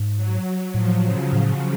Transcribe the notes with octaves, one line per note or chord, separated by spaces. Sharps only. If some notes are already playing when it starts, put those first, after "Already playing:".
Already playing: G#2
F#3
A2 F3
C#3
A2